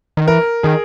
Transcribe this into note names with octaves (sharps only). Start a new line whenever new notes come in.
D#3
E3 A#4
D#3 G#4